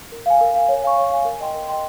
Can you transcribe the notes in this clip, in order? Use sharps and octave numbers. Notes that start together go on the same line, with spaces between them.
A#4
F5 G#5
A#4
F5 G#5
C#5
F5 G#5 C#6
C#5
F5 G#5 C#6
A#4
D#5 G5 C6
A#4
D#5 G5 C6